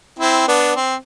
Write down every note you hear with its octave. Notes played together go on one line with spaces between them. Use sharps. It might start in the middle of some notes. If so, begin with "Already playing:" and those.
C4 E4
B3 D4
C4